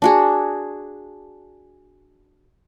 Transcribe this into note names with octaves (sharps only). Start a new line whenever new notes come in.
D4 F#4 G#4